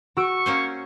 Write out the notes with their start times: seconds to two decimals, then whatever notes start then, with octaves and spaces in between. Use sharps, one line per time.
0.17 F#4 C#6 E6 D7
0.46 A#3 C#4 C5